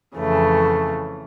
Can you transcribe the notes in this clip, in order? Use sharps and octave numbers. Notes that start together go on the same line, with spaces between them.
F2 C#3 E3 A3